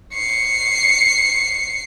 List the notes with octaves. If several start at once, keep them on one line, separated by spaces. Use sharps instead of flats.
C7 C#7